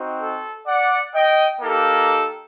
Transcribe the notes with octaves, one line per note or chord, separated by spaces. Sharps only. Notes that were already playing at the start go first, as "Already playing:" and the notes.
Already playing: C4 D#4 F#4
A4
D5 F#5
D#5 G5
A#3 D#4 G4 A4